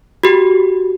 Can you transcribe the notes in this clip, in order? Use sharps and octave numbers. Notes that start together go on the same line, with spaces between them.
F#4 G4